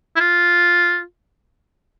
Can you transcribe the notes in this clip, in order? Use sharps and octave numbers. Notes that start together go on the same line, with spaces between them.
E4
F4